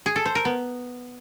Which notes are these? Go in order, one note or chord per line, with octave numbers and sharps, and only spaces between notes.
G#4
A4
C5
A#4
B3